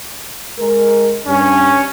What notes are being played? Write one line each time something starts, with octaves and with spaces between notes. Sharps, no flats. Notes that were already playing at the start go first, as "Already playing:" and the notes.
G#3 A#4
G2 C#4